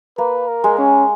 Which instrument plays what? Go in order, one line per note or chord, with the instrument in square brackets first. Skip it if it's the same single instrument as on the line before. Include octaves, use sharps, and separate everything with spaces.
[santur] A#3 [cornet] B4
[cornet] A#4
[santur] G#3
[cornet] C#4